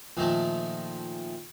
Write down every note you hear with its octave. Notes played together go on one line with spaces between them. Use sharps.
A#2 D#3 F3 A3